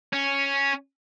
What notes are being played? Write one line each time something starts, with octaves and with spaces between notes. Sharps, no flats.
C#4